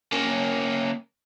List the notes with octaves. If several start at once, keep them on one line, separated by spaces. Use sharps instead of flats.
A#3 C#4